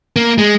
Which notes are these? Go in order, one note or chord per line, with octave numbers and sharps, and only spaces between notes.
A#3
G#3